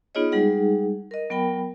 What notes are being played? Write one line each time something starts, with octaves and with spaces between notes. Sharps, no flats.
B3 D#4 F4 G#4 C#5 D#5
G3 G#3 D#4 G#4 F#5
A#4 D#5
F#3 B3 A#4 G5 B5